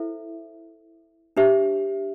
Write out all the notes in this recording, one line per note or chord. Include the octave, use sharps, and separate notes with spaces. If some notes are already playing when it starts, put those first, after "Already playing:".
Already playing: E4 A4 C5 E5
D4 G4 C5 E5